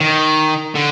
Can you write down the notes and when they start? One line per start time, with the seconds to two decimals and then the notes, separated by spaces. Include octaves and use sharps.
0.01 D#3
0.76 D3